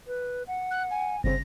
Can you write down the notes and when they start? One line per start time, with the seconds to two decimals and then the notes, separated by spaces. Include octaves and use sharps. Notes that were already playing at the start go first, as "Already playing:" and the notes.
0.07 B4
0.47 F#5
0.71 F#6
0.90 G#5
1.24 G1 C#3 C4 A#6